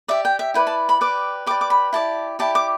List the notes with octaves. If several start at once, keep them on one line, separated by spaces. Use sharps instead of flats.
G4 D5 E5
G5
E5
E4 B4 D5 G5
A5
B5
G4 B4 D5 D6
G4 B4 D5 D6
D6
B5
E4 G4 D5 A5
E4 G4 D5 A5
D6